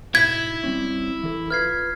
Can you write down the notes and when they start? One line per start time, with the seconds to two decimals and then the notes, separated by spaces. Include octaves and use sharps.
0.15 B1 G#2 E4 E5 G#6 B6
0.64 G3 C4 C#4
1.23 E3 A4
1.50 F4 B4 F6 G#6 C7